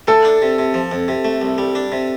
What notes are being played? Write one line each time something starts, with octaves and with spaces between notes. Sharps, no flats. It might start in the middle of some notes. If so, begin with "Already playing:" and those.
A3 A4
D4
C3
C3
F3
F2
C3
A3
C2
G3
D4
C3